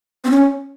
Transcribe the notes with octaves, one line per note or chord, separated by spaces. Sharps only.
C4
C#4